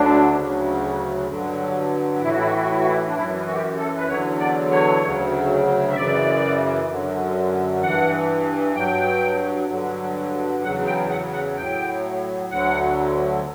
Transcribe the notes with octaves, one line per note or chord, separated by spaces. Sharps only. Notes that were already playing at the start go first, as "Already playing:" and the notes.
Already playing: D2 D3 F#3 D4
D2 C#3 F#3
G2 D3 F#3
A2 E3 E4
F#4
E4
F#4
E4
F#4
E4
F#4
E4
D4
F#2 E3 E4
F#4
G4
F#4
A4
B4
E2 D3 F#3 C#5
D5
C#5
D2 C#3 F#3
E5
F#2 C#3 E3 D5
F#2 D3 F#3
G2 E3 F#5
G2 F#3 G5
G2 D3 F#3
E2 C#3 F#3 F#5
G5
F#5
F#5
A2 F#3 G5
D2 D3 F#3 F#5